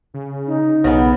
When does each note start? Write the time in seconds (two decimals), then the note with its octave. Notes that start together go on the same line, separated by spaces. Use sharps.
0.14 C#3
0.47 D#4
0.84 B1 C#3 B3